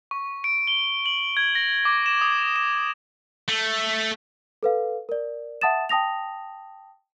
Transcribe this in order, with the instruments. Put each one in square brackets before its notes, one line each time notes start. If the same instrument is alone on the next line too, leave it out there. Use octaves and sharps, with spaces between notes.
[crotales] C#6
D7
G7
F#7
G#6
A#6
D6
E7
D#6
E7
[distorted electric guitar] A3
[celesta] A4 B4 F5
A#4 D5
E5 F#5 A5 D#6 A6 E7
G5 A5 D#6 A#6 F7